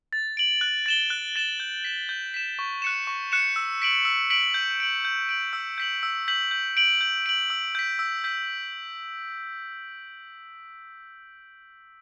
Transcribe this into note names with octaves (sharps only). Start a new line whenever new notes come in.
A6
D7 F#7
F#6
A6 E7 G7
F#6
A6 E7 G7
G6
B6 E7
G6
B6 E7
C#6
F#6 C#7 E7
C#6
F#6 C#7 E7
E6
B6 D7 F#7
E6
B6 D7 F#7
G6
D7 F#7
G6
D7 F#7
E6
G6 B6 F#7
E6
G6 B6 F#7
G6
D7 F#7
G6
D7 F#7
E6
G6 B6
E6
G6 B6